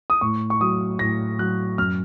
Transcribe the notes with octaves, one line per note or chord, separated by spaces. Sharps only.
D#6
A2 C#6
C#6
F#3 D#6
A2 A#6
F#3 F#6
F#2 F6